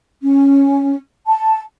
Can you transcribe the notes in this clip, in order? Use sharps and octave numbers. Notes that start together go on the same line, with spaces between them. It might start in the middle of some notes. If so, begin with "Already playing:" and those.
C#4
A5